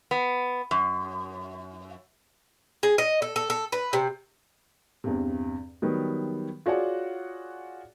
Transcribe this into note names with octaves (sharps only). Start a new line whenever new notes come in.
B3
F#2
G#4
D#5
A4
A4
A4
B4
C3
E2 G2 C3
D#3 F#3 G3 B3
F4 F#4 G#4 C#5 D5 F#5